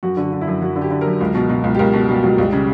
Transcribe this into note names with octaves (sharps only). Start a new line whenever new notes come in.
F#2 F#4
D3
F#4
D3
E4
F#2
F#2 F#4
D3
G4
D3
A#4
F#2
C#2
B2
B2
C#2
G4
C#2 A#4
B2
B2 G3
C#2 F#3
C#2 G3
C#3